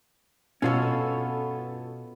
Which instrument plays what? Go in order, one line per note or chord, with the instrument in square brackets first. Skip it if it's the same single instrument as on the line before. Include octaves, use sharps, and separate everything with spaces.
[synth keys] G2 A4 [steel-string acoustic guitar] B2 [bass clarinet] B3 [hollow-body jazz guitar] C#4 F4 C#5